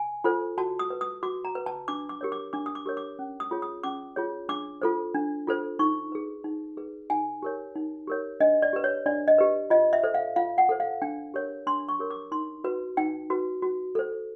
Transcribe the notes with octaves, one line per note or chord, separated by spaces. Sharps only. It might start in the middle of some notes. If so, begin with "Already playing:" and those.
Already playing: G#5
F4 A4 C5
F#4 A5
D#6
B4
D#6
F#4 D6
A#5
B4
A5
D4 D6
D6
G4 A#4 C#5
D6
D4 D6
D#6
D6
G4 A#4 C#5
D6
C#4
D#6
F4 G#4 C#5
D#6
C#4 D6
F4 G#4 C#5
D4 D6
F4 A4 C5
D4
F4 A4 C5
D#4 C#6
G#4 B4
D#4
G#4 B4
D#4 G#5
G4 A#4 C#5
D#4
G4 A#4 C#5
D4 D#5
D5
G4 B4
C#5
D4 D5
D#5
G4 B4
F4 D#5
E5
A4 C5
F5
F4 F5
F#5
A4 C5
F5
D4 G5
G4 A#4 C#5
D4 C6
C#6
G4 A#4 C#5
D6
D#4 C6
F#4 B4
D#4 G5
F#4 B4
F#4
A4 C5